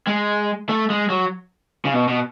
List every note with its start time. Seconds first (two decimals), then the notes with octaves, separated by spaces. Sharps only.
0.07 G#3
0.69 A3
0.90 G#3
1.10 F#3
1.85 C#3
1.94 B2
2.08 B2